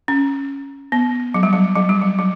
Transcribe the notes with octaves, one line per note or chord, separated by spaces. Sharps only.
C#4
B3
F#3
G3
F#3
F#3
G3
F#3
F#3